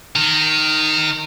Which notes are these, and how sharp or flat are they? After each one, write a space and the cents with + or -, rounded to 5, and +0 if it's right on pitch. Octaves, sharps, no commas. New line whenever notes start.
D#3 +0 A#5 -35